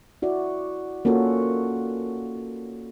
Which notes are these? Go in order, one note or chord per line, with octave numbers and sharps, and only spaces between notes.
E4 F#4 D5
A#3 C#4 F4 F#4 A4